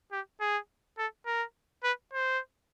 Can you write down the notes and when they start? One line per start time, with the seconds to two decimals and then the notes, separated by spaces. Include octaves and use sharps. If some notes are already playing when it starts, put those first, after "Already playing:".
0.12 G4
0.41 G#4
0.98 A4
1.26 A#4
1.83 B4
2.13 C5